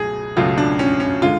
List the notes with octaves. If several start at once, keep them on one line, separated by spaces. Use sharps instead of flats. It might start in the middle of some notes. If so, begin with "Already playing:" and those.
Already playing: C#2 B2 F#3 A3 G#4
C#2 B2 F#3 A3 F4
D4
C#4
C#4
D3 G#3 F4